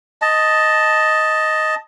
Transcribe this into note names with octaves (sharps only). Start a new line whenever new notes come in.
D#5 A5